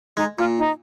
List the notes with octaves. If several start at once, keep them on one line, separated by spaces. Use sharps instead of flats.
G#3 D#4
A#2 F4
D#4